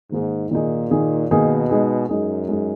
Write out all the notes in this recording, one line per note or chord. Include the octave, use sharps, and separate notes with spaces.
G#2 D#3 A#3 D#4 G#4
A#2 D#3 A#3 D#4 G#4
D#3 A#3 D#4 G#4
B2 D#3 A#3 D#4 G#4
G#3 D#4 G#4
F#2 G#3 D#4 G#4
G#3 D#4 G#4